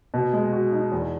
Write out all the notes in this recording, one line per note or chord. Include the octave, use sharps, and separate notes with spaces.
B2
G#3
F#4
D#4
E2